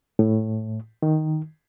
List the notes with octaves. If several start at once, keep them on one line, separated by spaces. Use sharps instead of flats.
A2
D#3